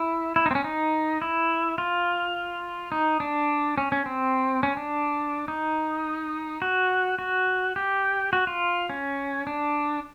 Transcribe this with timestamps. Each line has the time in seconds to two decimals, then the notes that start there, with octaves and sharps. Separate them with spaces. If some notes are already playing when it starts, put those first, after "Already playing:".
Already playing: E4
0.36 E4
0.46 D#4
0.51 C4
0.55 C#4
0.64 D#4
1.22 E4
1.78 F4
2.92 D#4
3.20 D4
3.78 C#4
3.92 C#4
4.06 C4
4.63 C#4
4.77 D4
5.48 D#4
6.62 F#4
7.19 F#4
7.76 G4
8.33 F#4
8.47 F4
8.90 C#4
9.47 D4